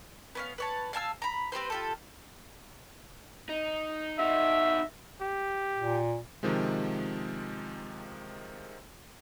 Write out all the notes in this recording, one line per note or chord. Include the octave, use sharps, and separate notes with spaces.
B3 C#4 F5
B4 C#5 A5
F5 G#5 A5 E6
A#5 B5
C4 G4 B4 C5
F4 G4 A4
D#4
D#4 F#4 E5
G4
A#2
C3 D#3 F3 G#3